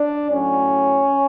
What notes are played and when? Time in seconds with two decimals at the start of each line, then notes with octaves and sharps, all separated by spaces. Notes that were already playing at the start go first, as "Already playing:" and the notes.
Already playing: D4
0.28 A2 F#3 C#4